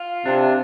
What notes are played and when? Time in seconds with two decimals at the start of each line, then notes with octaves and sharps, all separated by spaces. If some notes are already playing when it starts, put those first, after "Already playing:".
Already playing: F4
0.25 C3 D4